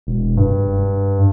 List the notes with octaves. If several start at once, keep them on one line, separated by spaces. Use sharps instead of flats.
E1
G2